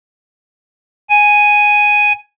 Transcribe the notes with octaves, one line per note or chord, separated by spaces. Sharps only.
G#5